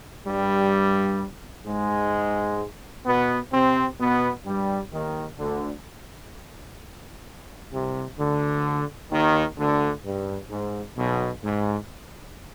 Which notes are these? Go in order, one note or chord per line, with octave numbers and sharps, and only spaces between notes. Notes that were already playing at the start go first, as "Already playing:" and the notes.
G2 G3
G#2 G#3
B2 B3
C3 C4
B2 B3
G2 G3
D#2 D#3
D2 D3
C2 C3
D2 D3
D#2 D#3
D2 D3
G2
G#2
B1 B2
G#2